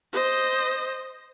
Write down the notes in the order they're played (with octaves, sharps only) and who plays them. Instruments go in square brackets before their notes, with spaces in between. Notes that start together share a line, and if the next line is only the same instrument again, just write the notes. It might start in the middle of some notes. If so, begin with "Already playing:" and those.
[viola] C5 D#5